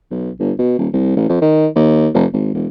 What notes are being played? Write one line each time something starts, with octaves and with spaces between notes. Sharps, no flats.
B1
G1
B2
D#1
C2
A1
F2
D#3
D#2
F1
G#1
E1